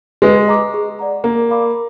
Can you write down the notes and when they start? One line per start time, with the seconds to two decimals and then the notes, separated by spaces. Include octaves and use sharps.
0.22 G#3 B4
0.48 D#5 A#5 D6
0.74 G#4
0.99 D5 F#5 A#5
1.24 A#3 A#4
1.50 D5 F5 B5 D6